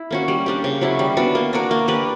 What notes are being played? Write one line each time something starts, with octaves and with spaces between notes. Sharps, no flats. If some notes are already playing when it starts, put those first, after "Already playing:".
Already playing: E4
A#3 C#4 F#4
G3
A#3 D4 G4
C#3
F#3 C#4 E4
G3
B3 D4 F#4
A#3
D4 F#4 A#4
A#3
D4 G4 B4